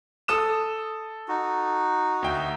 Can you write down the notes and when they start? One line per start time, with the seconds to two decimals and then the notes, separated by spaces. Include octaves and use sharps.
0.28 A4 D#6 E7
1.28 D#4 F#4
2.22 D2 G5